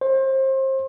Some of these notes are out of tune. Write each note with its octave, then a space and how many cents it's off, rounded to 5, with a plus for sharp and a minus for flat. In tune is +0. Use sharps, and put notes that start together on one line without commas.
C5 +30